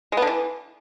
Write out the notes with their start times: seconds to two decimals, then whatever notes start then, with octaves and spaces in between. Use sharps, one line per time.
0.12 G#3
0.17 B3
0.22 D3
0.27 E3